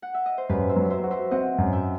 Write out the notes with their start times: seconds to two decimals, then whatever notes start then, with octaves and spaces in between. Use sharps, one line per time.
0.02 F#5
0.14 E5
0.26 D#5
0.38 C5
0.49 F#2 G4 B4
0.69 C5 E5
0.76 F#3
0.90 C5 E5
1.04 F#4
1.11 C5 E5
1.31 C4 D#5 F#5
1.58 F#2
1.72 E5 G5